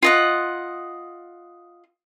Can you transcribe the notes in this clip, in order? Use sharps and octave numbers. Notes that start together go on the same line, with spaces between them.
F4 D#5 F#5